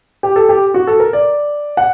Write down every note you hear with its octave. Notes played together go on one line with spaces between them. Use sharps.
G4
A4
G4
F#4
A4
A#4
D5
F#5